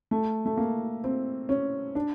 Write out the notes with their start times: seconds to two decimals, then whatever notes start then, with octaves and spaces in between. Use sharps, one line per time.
0.11 A3
0.46 A3
0.57 A#3
1.04 C4
1.49 C#4
1.95 D4